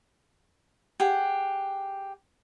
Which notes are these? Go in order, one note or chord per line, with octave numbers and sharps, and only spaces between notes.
G4 G#4 F#5